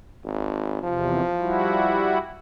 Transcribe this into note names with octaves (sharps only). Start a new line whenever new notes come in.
G#1
E2 C3 F3
G3 E4 F#4